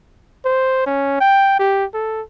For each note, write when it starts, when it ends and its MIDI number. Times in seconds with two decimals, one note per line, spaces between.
0.45 0.86 72
0.87 1.19 61
1.21 1.57 79
1.59 1.85 67
1.94 2.22 69